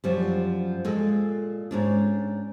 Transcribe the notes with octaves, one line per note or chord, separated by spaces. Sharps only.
F#2 F3 G3
A#2 G#3 A4
G#2 C#4 D4